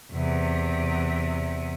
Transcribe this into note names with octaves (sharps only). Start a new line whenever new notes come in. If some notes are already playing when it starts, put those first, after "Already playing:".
E2 C3